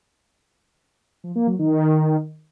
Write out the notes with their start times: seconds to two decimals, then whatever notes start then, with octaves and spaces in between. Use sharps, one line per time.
1.24 F3
1.35 A#3
1.47 F#3
1.59 D#3